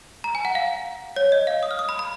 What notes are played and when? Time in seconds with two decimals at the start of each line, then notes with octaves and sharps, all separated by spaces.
0.24 A#5
0.35 G#5
0.45 F#5
0.55 F5
1.16 C#5
1.32 D#5
1.47 F5
1.63 D#6
1.71 F6
1.79 D#6
1.89 B5
1.99 B5